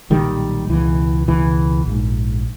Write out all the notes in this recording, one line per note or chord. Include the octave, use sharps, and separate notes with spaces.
B1 A#2 D#3 G3
C#2 B2 E3
C#2 B2 E3
A#1 G#2